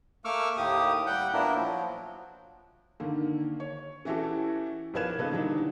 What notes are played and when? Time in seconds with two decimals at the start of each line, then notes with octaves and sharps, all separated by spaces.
0.25 A3 A#3 C#6 D6 E6 F6
0.57 D#2 A2 A#3 G4 D#6
1.07 G3 F#5 G5 G6
1.33 A#2 A#3 B3 D4 E4 A#4
1.55 F3 F#3
3.00 D3 D#3 A#3
3.60 C#5
4.05 E3 C#4 E4 F#4 G4 A4
4.94 B1 F3 A#4 B4 G#6 E7
5.18 C#3 A#3 D#4 A4 B4
5.30 D3 E3 F#3 G3 D4 D#4